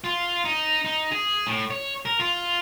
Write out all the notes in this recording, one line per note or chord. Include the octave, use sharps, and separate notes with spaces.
F4
D#4
D#4
G#4
A2
C#5
A#4
F4